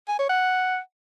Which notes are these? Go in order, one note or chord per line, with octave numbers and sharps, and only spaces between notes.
G#5
C#5
F#5